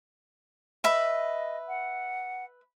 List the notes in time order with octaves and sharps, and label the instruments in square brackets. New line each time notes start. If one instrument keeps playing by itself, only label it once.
[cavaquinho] B4 E5 B5 [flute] D#5
[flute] F#5